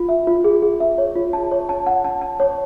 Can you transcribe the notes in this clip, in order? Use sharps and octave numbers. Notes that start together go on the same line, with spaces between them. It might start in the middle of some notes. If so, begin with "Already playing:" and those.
Already playing: F4
E5
F4
G#4
G#4
E5
C#5
F4
A5
C#5
A5
F#5
A5
A5
C#5